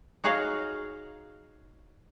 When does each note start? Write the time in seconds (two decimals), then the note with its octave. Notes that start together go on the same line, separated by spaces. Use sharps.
0.24 D#4 F#4 G#4 C#5 D#5 F5